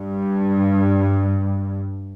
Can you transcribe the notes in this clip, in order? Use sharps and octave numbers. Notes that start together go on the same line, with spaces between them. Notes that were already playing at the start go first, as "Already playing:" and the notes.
Already playing: G2